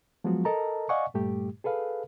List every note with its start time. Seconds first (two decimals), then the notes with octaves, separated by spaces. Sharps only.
0.24 F3 F#3 G#3 B3 F4 F#4
0.45 A4 A#4 D#5 A5 A#5
0.89 D5 D#5 F5 F#5 G#5 C#6
1.14 G2 A#2 G3 A3 G4
1.64 G#4 A4 B4 F5